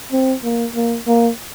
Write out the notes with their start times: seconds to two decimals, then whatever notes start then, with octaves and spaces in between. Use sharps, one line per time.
0.12 C4
0.44 A#3
0.75 A#3
1.07 A#3